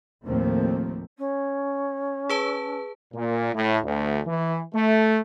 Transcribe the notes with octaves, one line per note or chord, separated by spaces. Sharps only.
D#2 A2 F3 A3 A#3 C4
C#4
G#4 B4 A5
A#2
A2
D2
E3
A3